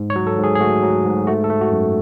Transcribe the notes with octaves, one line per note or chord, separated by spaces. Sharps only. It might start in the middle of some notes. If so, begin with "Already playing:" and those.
Already playing: G#2
C#5
F#3
A4
G#2
G#4
G#4
A3 F#4
F#3
G#2
A3 F#4
A4
A3
F#4
F#2